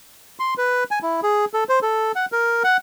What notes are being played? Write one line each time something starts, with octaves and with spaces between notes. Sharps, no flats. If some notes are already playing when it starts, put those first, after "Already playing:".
C6
B4
G#5
E4
G#4
A4
C5
A4
F#5
A#4
F#5